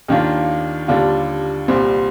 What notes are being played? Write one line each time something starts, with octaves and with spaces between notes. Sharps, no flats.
D#2 D#3 A#3 D4 F4
D#2 D3 G3 D4 F4
C2 A#2 G3 C4